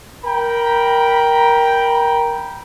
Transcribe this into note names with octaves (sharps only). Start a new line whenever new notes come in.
A#4 G5 A#5 B5